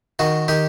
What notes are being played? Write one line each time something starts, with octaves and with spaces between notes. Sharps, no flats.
D#3 F#4
D#3 G4